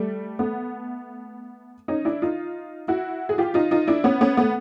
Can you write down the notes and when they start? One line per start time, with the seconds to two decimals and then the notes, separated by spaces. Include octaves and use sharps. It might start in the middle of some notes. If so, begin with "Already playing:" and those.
Already playing: G3 A3
0.39 A3 B3
1.88 C#4 D#4
2.05 D4 E4
2.22 D#4 F4
2.88 E4 F#4
3.29 G#4
3.38 F4 G4
3.54 D#4 F4
3.71 D#4 F4
3.88 D4 E4
4.04 B3 C#4
4.21 B3 C#4
4.37 A3 B3